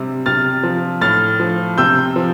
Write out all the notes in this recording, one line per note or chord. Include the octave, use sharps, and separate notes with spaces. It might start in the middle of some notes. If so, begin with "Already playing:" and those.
Already playing: C3 G3
C3 F6 A6
F3
A2 F6 A6
F3
C3 E6 G6
F3